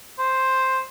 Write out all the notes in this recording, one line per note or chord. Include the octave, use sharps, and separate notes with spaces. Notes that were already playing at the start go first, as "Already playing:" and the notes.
C5